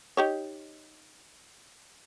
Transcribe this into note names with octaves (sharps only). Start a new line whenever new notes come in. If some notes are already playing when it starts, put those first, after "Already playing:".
D#4 G4 C#5